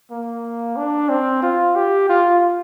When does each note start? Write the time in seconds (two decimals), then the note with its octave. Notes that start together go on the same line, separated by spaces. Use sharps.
0.11 A#3
0.77 D4
1.09 C4
1.43 F4
1.76 G4
2.09 F4